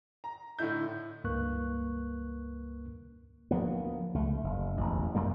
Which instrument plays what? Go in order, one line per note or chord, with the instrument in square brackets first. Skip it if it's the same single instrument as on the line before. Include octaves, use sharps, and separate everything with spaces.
[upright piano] A#5
A2 D3 D#4 E4 G6
[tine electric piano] C#2 G2 A#3 B4 C#6 F#6
[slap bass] D2 F3 A#3 B3
C#2 A3
F#1
E1 A1
C2 F#2 G3 A#3